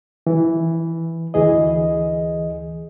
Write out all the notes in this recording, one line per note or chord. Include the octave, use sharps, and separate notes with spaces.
E3
D2 E3 G#4 D#5